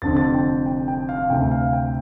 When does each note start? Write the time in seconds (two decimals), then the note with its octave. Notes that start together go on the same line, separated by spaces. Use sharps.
0.02 F1 F2 D3 A6
0.17 A6
0.34 G5
0.66 G5
0.88 G5
1.09 F5
1.30 D2 C3 G5
1.51 F5
1.73 G5